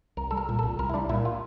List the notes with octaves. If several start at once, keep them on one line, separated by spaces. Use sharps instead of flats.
C2 A#4
G3 A4
A#4
A#2
A4
C2
C2 A#4
E4
G3 D4
A#2 E4
F4